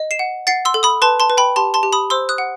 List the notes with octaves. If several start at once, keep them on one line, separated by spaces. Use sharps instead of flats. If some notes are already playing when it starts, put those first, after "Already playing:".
Already playing: D#5
C7 E7
F#5
F#5 A6 C7
C6 E6
A4
B5 D#6
B4 A5 C6
A5 C6
B4
G5 B5
G4 A5 C6
A5 C6
G4
B5 D#6
C5 C6 E6
D#6 F#6
F#5